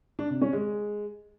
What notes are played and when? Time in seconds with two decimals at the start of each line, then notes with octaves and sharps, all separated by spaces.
0.19 D4
0.30 C3
0.42 C#4
0.53 G#3